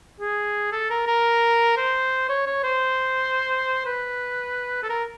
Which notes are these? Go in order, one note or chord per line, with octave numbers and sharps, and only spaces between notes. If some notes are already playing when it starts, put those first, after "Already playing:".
G#4
A4
A#4
A#4
C5
C#5
C#5
C5
B4
A4
A#4